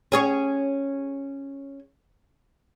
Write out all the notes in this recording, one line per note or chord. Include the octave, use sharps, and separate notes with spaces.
C#4 G#4 C#5